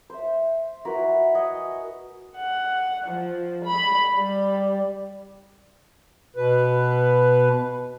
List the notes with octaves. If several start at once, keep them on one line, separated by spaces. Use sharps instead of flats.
C5 E5
E4 F#4 A#4 B4
D#5 F#5 G#5
F#5
F3
B5
G3
B2 B4